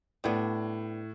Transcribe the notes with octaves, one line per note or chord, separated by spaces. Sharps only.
A2 G3 B3 D4